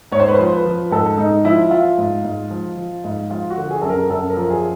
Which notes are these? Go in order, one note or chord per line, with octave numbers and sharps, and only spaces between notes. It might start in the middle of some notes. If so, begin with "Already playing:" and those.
G#2 C#5
C5
B4
F3 C5
B4
F3
G#2 A4
G#2 D#4
F3 E4
F3 F4
G#2
G#2
F3
F3
G#2
F3 F4
F#4
D3
G#4
F#2 A4
A#4
F#2 A4
A#4
F3
G#4